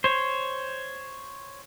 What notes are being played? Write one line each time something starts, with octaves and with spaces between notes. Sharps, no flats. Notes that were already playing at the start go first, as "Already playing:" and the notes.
C5 C#5